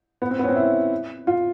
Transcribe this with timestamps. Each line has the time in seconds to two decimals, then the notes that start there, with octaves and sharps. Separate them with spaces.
0.22 B3
0.31 C4
0.39 B3
0.44 C#4
0.48 C4
0.56 E4
1.27 F4